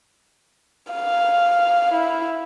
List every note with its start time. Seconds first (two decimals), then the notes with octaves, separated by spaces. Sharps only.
0.92 F5
1.94 E4